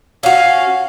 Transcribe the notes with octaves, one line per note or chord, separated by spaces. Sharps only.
C#4 F#4 F5